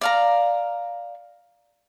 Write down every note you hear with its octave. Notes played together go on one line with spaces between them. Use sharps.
D5 F5 A#5